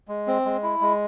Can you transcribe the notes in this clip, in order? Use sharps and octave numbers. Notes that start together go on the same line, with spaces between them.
G#3
C4
G#3
E4
G#3